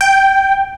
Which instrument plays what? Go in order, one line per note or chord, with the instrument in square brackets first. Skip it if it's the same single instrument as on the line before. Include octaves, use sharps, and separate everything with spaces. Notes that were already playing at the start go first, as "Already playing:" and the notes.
[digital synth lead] G5